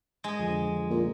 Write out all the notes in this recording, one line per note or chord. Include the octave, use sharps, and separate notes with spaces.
G#3 D#5
F2 D3 F3
A#2